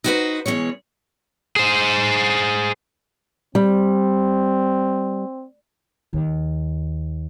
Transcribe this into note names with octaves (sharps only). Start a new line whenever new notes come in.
D#4 E4 F#4 G4 B4 C5
B2 E3 G#3 C#5
G#4 C5
G3 C4
D#2